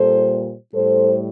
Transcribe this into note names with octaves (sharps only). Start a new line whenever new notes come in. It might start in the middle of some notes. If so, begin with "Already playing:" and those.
Already playing: A#2 G3 A4 C5
A2 G3 A4 C5